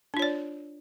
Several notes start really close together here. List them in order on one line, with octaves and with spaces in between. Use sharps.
D4 F4 C#5 D5